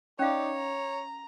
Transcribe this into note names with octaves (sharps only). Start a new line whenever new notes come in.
C#4 D#4 C#5 D5 F5
A#5